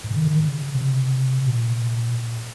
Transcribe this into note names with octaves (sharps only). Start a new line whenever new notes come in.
G#2
C#3
D#3
D#3
C#3
C3
A#2